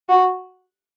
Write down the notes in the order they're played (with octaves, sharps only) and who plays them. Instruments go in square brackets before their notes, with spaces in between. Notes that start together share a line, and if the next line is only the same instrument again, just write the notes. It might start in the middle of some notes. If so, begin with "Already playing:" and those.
[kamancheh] F#4